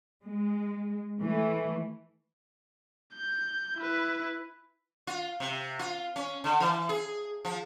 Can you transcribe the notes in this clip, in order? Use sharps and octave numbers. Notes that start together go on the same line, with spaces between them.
G#3
E3 A3
G6
E4 B4
F4
C3
F4
C#4
D3
E3
G#4
F3